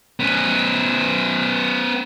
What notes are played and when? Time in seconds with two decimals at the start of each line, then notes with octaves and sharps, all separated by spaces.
0.20 B3 C#4